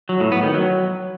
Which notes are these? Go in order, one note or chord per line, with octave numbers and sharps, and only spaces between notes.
F#3
A2
B3
D#3
F#3